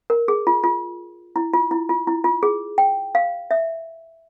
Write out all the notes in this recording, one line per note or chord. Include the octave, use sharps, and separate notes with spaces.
A#4
G#4
F4
F4
E4
F4
E4
F4
E4
F4
G#4
G5
F5
E5